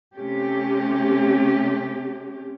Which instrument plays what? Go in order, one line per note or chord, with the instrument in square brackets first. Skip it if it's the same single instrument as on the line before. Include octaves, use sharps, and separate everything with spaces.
[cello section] C3 A3 C#4 G4